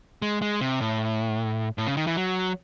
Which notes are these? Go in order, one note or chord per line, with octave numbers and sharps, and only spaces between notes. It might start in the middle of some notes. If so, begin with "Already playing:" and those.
G#3
G#3
C3
A2
A2
C#3
D#3
E3
F#3